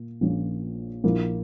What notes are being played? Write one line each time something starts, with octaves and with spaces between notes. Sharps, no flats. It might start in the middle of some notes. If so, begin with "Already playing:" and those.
Already playing: A#2 A#3
A#1 A#2 A#3 C#4
A#1 A#2 A#3 E4 A#4